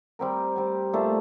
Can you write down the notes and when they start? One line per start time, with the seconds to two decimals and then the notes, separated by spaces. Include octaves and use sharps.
0.19 G3 C4 G4 A#4
0.56 G3 C4 G4
0.93 A#2 A3 D4 A4